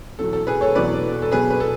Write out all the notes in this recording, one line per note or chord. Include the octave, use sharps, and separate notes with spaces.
E2 B2 F#3 A4
A4
G#4 B4
A4 C#5
E2 B2 F#3 B4 D5
A4
B2 F#3 G#4 B4
B4
A4